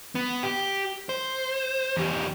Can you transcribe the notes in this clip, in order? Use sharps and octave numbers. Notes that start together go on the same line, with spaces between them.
B3
G4
C5
E2 G4